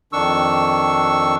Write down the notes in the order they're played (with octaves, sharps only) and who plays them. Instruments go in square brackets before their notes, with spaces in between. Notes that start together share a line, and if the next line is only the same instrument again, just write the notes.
[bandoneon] F2 D#3 D4 C#6 E6